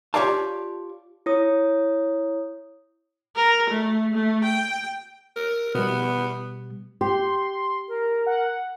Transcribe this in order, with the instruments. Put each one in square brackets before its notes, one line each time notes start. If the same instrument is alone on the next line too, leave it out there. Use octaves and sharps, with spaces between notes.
[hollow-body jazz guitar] F4 G4 C#5 D5 F5 A5
[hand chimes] E4 C#5 D#6
[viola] A#4
A3
A3
G5
[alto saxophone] A#4
[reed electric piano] B2 G3 [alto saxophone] B3
[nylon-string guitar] G4 [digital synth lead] C6
[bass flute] A#4
[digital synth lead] F#5